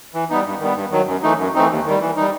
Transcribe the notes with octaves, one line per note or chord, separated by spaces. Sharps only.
E3
G3 B3 D#4
G2
D#3 G3 B3
G2
D#3 F#3
F#2
E3 A3 D#4
F#2
E3 A3 C4 D#4
D#2
D#3 G3
E3
G3 D#4